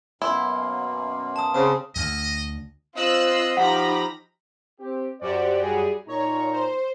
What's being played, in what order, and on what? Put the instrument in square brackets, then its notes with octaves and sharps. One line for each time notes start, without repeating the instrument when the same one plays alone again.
[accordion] F#2 B2 A#3 [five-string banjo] E4 [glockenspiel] C6
[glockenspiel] A5 D#6
[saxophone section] C#3 C4 [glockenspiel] D#6
[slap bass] D2 [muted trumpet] D#5
[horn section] C4 D#5 [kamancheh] F4 C5 [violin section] E6 F#6
[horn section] F3 [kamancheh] D#4 G4 [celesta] F#5 [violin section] A#5 B5 A#6
[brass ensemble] C4 G4
[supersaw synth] F#2 F#4 G4 [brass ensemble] C5 D5
[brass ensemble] G3 G#4
[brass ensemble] A#2 D#4 A#5 [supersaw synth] C#5
[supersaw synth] C5